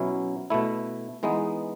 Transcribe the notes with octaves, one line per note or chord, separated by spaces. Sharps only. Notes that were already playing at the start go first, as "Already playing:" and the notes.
Already playing: B2 F#3 C#4 E4
B2 A3 E4
E3 G#3 B3 D#4